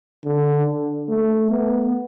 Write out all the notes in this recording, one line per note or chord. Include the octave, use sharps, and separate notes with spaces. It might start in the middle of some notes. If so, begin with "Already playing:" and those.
D3
A3
B3